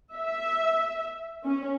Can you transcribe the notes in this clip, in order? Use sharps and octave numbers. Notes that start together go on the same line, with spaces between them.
E5
C#4